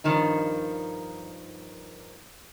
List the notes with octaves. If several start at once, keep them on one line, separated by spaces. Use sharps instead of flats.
G2 D#3 F3 D#4